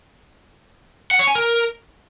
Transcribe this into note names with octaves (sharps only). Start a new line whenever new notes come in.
F#5
C#5
G#5
A#4